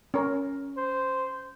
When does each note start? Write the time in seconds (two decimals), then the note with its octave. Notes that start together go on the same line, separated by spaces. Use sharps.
0.14 C#4 A#4
0.78 C5